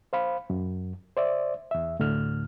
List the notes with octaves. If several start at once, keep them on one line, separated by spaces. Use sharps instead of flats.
C5 F5 B5
F#2
C5 D5 E5
E2 E5
D2 A2 D3 F6